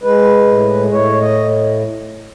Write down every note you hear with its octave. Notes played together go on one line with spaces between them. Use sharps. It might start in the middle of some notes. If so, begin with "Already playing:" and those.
G#3 B4
A2
A2 C#5
D#5